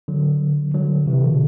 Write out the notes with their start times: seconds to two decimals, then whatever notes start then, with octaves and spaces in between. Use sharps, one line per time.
0.08 D3 F#3
0.74 D3 F#3
1.06 C3 E3
1.23 B2 D3